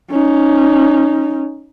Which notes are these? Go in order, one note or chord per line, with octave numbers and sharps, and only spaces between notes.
C#4 D#4